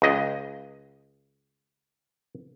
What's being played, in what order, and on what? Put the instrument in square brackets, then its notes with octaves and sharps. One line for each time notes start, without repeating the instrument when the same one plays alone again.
[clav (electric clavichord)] C#2 D#5